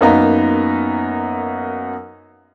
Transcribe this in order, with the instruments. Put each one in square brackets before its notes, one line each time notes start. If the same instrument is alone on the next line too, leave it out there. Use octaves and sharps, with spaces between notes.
[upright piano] F#2 A#3 B3 D#4 F5 A#5